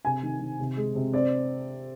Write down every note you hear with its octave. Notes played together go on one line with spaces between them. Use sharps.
C3 G#5
D#3
D#3
C3
G#3
C3
C4 D5